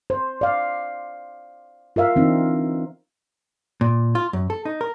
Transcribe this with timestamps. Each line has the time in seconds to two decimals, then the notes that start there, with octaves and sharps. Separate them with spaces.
0.10 C5
0.41 D5 F5
1.96 F4 A#4 E5 F5
2.16 E3 C4 D4 D#4
3.81 A#2
4.15 F4
4.33 F#2
4.50 A4
4.65 D#4
4.81 A#4